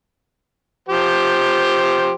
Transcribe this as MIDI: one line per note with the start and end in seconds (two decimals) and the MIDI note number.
0.89 2.14 53
0.89 2.14 67
0.89 2.14 72